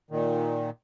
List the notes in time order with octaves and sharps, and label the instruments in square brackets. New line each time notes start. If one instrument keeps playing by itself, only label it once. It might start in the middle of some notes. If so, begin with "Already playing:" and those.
[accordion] A#2 D#3